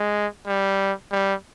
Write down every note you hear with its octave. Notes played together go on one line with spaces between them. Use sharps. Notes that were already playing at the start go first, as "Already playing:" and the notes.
Already playing: G#3
G3
G3